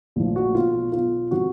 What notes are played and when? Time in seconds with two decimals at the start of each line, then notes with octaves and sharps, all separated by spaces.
0.16 A#1 A2 F3
0.36 F#4
0.54 B1 B2 F4
0.92 B1 B2 F4
1.31 C3 F3 F#4